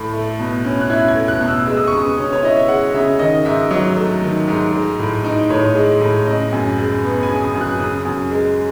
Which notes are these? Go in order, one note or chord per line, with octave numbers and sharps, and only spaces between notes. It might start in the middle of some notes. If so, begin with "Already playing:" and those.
Already playing: A2
A3
B2
C#4
F#6
E4 G#6
G#6
A3
F#6
B2
E6
G#3 E6
D#6
C#3 C#6
D#6
C#4
C#5
E4 D#5
E5
G#3 F#5
C#3 E5
D#3 D#5
G#2 E5
F#3 D#5
A3
D#3
G#2
G#3
A2
D#4
A2 C#5
G#3
A2
C#3 D#5
F#2
G#3
B3
G#5
C#3
D#6
F#2
F#6
C#3 D#6
F#2
G#3